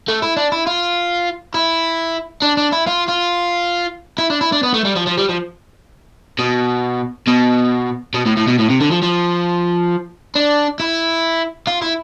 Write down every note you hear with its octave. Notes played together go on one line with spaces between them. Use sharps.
A3
E4
D4
E4
F4
E4
D4
D4
E4
F4
F4
E4
D4
E4
D4
B3
A3
G3
F3
F3
G3
F3
B2
B2
B2
A2
A2
B2
A2
C3
D3
F3
F3
D4
E4
F4
E4